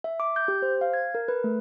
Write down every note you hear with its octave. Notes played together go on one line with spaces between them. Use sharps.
E5
D6
G6
G4
C5
F5
G#6
A#4
B4
A3